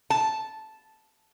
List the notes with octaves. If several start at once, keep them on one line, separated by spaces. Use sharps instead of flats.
A5